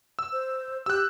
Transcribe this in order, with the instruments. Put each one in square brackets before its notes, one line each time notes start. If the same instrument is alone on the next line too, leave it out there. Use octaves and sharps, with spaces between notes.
[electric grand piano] E6
[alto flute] C5
[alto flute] G4 [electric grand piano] E6 F#6